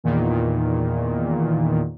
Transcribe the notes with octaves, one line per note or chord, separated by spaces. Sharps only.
E2 A#2 D#3